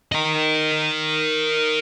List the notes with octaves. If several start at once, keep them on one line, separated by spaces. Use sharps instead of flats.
A#4 D#5